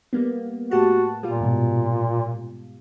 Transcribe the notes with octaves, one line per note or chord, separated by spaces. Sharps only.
G3 A#3 B3
A2 F#4 G4 A5
A#2 G3 F4
G#2 B2